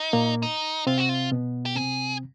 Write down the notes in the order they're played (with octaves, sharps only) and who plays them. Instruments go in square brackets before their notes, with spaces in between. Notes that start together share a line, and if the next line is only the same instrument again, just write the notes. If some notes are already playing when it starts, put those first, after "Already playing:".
Already playing: [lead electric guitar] D#4
[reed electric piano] A#2 A#3
[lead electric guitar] D#4
[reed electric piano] C3 C4 [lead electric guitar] F4
[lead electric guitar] F#4
F4
[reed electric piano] B2 B3
[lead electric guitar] G4
[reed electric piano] C3 C4 [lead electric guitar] G#4